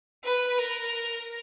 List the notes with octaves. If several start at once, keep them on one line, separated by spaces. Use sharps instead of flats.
B4
A#4